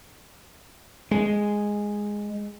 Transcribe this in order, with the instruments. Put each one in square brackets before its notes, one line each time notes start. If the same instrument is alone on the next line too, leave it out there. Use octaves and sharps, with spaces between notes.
[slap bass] G#3